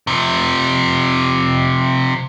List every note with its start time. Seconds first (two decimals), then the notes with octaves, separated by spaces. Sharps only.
0.07 C3 F3